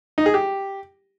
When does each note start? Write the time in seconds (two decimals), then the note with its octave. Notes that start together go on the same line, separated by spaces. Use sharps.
0.18 D#4
0.26 G#4
0.34 G4